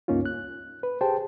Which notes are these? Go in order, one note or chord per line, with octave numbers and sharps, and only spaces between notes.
C#2 G2 A#3 C#4 D#4 F4
F#6
B4
G4 G#4 C5 G5 A5